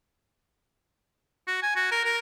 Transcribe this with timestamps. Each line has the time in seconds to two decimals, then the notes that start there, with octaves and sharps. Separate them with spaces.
1.47 F#4
1.63 G#5
1.76 F#4
1.91 A#4
2.05 A#4